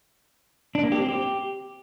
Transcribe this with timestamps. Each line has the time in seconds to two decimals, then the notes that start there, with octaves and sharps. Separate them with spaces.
0.75 D4
0.83 A#3
0.92 G4
1.00 C4
1.09 G4